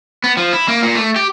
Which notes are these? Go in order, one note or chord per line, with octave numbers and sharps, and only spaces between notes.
B3
F3
E4
A#3
A#2
A3
G4